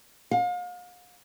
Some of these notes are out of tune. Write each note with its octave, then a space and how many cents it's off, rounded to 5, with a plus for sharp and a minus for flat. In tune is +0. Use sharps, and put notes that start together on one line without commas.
F5 +40